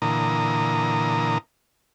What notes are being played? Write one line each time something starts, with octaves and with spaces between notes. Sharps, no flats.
A#2 D3 E3 A#4 A#5 D#6